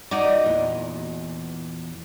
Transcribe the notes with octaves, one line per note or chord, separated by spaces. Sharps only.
D#4 F#4 D5
E2 A#2 E3